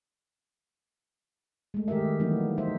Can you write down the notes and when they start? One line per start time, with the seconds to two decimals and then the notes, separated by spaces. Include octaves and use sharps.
1.74 G#3 A3
1.88 D#3 G4 G#4 A#4 E5
2.20 E3 F#3 G3 A#3 B3 D#4
2.58 D#4 C5 E5